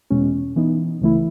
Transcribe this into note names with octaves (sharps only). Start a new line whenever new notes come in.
E2 B2 G#3 C#4
E3 B3 D#4
C#2 C#3 E3 A3 E4